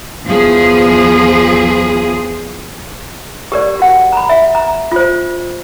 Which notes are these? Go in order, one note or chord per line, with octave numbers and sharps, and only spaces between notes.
E2 F3 G#4
G4 A#4 D5
F#4 F#5
A#5 B5
E5
A#5
F4 C5